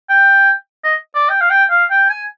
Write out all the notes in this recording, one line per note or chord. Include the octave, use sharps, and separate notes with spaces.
G5
D#5
D5
G5
F5
G5
F5
G5
G#5